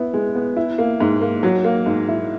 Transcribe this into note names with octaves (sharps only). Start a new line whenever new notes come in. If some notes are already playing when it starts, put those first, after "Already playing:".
Already playing: B3 E4
G#3
B3
E4
A#3
G#2
A#3
F#3
A#3
G#2
E4